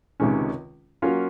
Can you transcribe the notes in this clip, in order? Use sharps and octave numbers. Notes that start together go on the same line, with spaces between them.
C#2 C3 D#3 G#3 C#4
F#3 A#3 C#4 F4